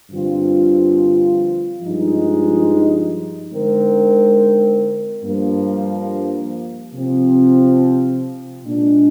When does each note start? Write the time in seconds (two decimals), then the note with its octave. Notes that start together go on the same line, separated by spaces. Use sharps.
0.11 G2 D3 F3 C4 F4
1.82 G2 F3 G#3 D#4
3.52 D3 G#3 C4 D#4 A#4
5.23 G2 F3 A#3
6.94 C3 F3 C4
8.65 A#2 G#3 D4